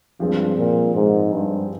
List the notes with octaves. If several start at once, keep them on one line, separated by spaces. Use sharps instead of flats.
G2 F3 G#3 C4
A#2
G#2
G2